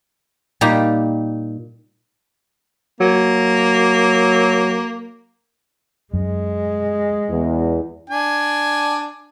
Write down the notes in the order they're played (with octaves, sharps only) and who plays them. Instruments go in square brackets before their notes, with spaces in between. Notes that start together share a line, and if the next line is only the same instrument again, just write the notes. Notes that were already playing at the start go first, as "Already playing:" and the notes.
[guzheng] A#2 G3 A#3 D#4 G4
[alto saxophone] F#3 [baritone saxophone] A#3
[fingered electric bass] F#2 [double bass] G#3
[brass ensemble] E2
[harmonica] D4 G#5